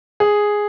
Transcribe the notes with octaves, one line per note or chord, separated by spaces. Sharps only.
G#4